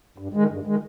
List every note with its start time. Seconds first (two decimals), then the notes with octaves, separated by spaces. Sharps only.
0.18 G2
0.34 D#3 G#3
0.50 G2
0.65 D#3 G#3